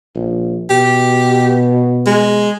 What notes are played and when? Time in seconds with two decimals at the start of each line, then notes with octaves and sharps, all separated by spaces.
0.15 A#1
0.70 B2 G4
2.07 G#3